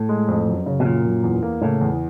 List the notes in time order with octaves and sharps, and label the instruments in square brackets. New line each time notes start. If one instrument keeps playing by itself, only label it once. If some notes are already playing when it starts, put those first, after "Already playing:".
Already playing: [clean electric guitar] A2
[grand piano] G#3
F2
F#2
C#3
[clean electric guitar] B2
[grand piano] F#2 [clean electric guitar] A#2
[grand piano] F#2
E2
A#3
[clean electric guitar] A2 [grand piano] C#3
[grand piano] E2